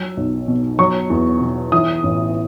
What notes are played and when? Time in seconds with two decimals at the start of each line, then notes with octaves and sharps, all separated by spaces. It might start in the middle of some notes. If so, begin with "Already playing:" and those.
Already playing: F#3 E6
0.17 B1
0.48 B2
0.79 F#3 C#6
1.10 E2
1.41 B2
1.72 E3 D#6
2.03 A1